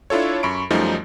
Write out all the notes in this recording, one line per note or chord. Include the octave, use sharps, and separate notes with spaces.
D4 E4 F4 A4 C#5
F#2 B5 C#6 D7
F#2 F3 G3 A3 D#4